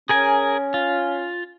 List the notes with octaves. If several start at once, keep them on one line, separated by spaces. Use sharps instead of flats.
C#4 G#4 A#4 G#5
F4